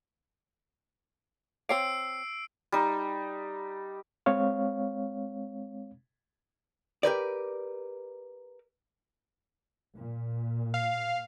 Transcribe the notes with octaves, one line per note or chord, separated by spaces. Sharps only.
C4 C#5 F5 E6 C7 D7
G3 D#4
G#3 C4 C#5 F5
G4 A#4 B4 D5
A#2
F5